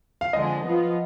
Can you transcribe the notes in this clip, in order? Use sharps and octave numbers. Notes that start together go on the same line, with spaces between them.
F5
F2 D3 G#3 D#5
F3 B3 F4